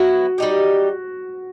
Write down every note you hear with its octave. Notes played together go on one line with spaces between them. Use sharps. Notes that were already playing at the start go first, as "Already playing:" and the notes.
Already playing: F#3 B3 E4 F#4
G3 D#4 G4